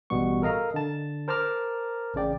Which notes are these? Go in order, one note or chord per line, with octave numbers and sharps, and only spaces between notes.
A1 B2 G3 B3 C#6
A4 A#4 D#5 F5 A#5
D3 A5
A#4 C5 A5 A#5 D6 F6
A1 C#3 D5 G5